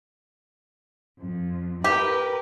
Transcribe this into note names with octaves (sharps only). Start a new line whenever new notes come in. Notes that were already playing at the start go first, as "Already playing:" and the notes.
F2
G4 A#4 B4